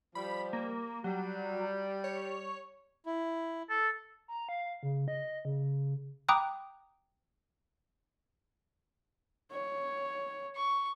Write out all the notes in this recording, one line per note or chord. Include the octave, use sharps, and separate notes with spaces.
F3 G3 B5
A#3
F#3 G3
C#5
E4
A4
A#5
F5
C#3
D#5
C#3
G5 A#5 B5 D6 D#6 F#6
C#5
C#6